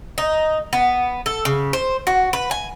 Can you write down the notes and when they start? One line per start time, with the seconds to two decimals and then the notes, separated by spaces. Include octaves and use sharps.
0.18 D#4
0.73 B3
1.26 A4
1.45 C#3
1.73 C5
2.07 F#4
2.33 B4
2.51 G#5